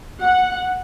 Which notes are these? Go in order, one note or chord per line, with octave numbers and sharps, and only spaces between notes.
F#5